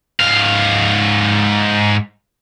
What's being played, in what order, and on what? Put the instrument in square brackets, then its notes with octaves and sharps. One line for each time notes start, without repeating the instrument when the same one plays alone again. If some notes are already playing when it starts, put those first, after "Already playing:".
[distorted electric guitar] G#2 F5